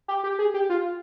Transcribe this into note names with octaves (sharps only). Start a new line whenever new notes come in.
G4
G4
G#4
G4
F4